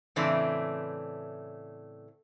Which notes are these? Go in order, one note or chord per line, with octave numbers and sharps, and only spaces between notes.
A2 C#3 E3 A3 C4 D4